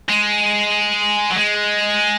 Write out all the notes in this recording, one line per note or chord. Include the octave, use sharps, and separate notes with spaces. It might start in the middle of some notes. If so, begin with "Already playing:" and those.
G#3
F#3
G#3